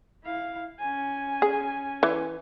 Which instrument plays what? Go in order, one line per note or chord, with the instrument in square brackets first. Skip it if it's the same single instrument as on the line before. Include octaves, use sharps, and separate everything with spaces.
[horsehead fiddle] E4 F5
C#4 G#5
[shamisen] G#4
E3